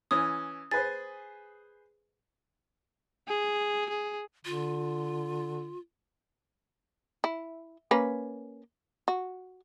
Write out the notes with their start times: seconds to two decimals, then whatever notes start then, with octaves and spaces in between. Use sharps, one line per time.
0.11 E3 C#4 D#6
0.71 G#4 B4 C5 A6
3.28 G#4
3.89 G#4
4.45 D3 F4
7.24 E4
7.91 A#3 C#4 B4
9.08 F#4